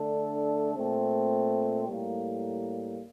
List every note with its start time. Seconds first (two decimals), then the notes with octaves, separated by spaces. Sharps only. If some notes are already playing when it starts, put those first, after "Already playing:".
Already playing: D3 A3 D4 A4
0.76 A#2 A3 C4
1.88 A2 G3 A#3